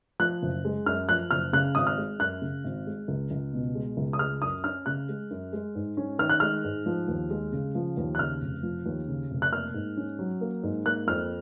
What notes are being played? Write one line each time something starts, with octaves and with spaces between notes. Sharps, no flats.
F3 F#6
F#1
G#3
F#2 F6
F3 F#6
F#1 F6
C#3 F#6
G#1 D#6
F6
G#3
F#2 F#6
C#3
G#1
G#3
C#2
C#2
B2
G#3
C#2
D#6
G#3 F6
F#2 D#6
C#4 F6
C#3 F#6
G#3
F#2
G#3
G#2
C#4
D#3 F6
F#6
G#3 F6
G#2
F3
D#2
G#3
C#3
F3
D#2
F#6
C#3 F6
F1
F3
D#2
C#3
F1
F#6
A#3 F6
G#2
C#4
F#3
A#3
G#2
A#3 F#6
F2 F6